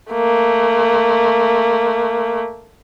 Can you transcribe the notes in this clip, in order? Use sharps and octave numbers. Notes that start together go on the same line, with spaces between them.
A3 A#3